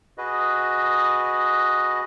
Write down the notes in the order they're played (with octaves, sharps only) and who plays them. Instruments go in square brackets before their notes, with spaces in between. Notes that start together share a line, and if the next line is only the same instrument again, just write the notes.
[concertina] F#4 G#4 B4 D#5